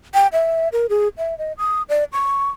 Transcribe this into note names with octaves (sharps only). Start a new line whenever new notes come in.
G5
E5
A#4
G#4
E5
D#5
D#6
D5
C#6